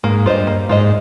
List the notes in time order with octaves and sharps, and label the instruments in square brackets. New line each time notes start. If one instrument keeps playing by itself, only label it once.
[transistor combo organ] G#2 [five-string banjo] A#3
[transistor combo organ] G2 [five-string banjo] F4 C5 D#5
[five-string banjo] A#3
[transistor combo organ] G#2 [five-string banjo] F4 C5 D#5